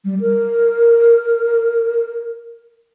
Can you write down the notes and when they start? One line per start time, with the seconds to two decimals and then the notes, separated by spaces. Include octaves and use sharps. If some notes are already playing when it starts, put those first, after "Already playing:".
0.05 G3
0.21 A#4